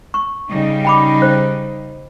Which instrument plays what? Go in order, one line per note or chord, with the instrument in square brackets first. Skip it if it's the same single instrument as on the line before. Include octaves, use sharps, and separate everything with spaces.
[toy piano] C#6
[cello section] C#3 G3 D#4
[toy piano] G5 B5 D6
C5